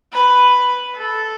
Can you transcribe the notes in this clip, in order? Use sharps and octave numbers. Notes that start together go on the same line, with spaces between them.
B4
A4